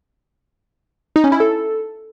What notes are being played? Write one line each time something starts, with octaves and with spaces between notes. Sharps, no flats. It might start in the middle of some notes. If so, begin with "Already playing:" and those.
D#4
C#4
E4
A4